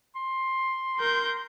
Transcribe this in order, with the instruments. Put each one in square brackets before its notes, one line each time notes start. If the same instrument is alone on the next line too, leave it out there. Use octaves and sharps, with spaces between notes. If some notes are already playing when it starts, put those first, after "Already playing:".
[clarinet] C6
[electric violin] A#4 G6